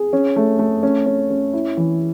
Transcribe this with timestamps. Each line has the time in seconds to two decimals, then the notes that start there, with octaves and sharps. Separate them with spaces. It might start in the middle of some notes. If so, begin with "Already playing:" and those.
Already playing: G#4
0.13 C#4
0.36 A3
0.59 A3
0.83 C#4
1.06 C#4
1.30 C#4
1.53 E4
1.77 E3